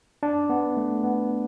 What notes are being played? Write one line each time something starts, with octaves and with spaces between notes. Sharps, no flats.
D4
B3
A3
B3